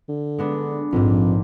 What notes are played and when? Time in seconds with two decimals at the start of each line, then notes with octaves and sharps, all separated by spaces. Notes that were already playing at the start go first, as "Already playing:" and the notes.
0.09 D3
0.38 G#3 B3 D4
0.92 A#1 F2 G#2